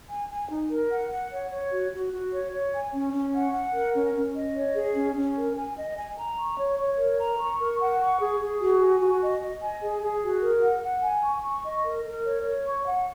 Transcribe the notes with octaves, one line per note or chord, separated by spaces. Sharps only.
G#5
G#5
D#4
A#4
F#5
F#5
C#5
C#5
F#4
F#4
F#4
C#5
C#5
G#5
C#4
C#4
F#5
F#5
A#4
C#4
C#4
D#5
C#5
G#4
C#4
C#4
A#4
G#5
D#5
G#5
A#5
C#6
C#5
C#5
A#4
A#5
C#6
A#4
F#5
C#6
G#4
G#4
F#4
G#5
F#4
D#5
D#5
G#5
G#4
G#4
F#4
A#4
F#5
F#5
G#5
C#6
C#6
D#5
A#4
A#4
C#5
C#5
C#6
F#5